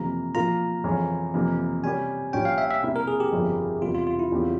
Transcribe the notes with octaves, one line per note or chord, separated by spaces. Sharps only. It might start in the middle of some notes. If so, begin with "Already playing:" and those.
Already playing: F2 C3 E3 A#3 A#5
A#2 F3 A#3 F4 A#4 A#5
F2 C#3 E3 G#3 C#4
F2 C3 E3 A#3
C3 G3 C#4 G4 A#4 G#5
A#1 A#2 G3 C#4 G5
F5
E5
E5
C3 G3 A#3 E4
A#4
G#4
G4
G1 F2 C#3 G3 C#4
E2 C3 G3 F4
F4
F4
E4
E2 C#3 G3 C4 G4